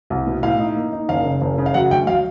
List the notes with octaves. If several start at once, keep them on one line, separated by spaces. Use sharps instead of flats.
C2
B2
A2 F5
D#4
A#3
D#4
F#1 F5
C#3
F#1
C#3
F5
F#3 F#5
D2 G5
F#3 F5